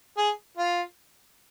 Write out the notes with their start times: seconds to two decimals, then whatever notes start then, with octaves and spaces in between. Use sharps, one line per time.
0.18 G#4
0.57 F4